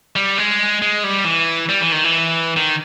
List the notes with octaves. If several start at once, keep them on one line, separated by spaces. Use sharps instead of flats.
G3
G#3
G#3
G3
E3
G3
E3
D#3
E3
D#3